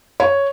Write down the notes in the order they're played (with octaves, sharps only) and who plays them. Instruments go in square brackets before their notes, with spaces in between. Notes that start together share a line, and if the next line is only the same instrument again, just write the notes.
[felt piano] C#5